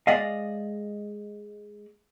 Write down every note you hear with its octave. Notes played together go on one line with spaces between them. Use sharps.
G#3 D5 D#5 F5